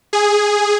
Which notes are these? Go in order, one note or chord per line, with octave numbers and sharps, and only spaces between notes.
G#4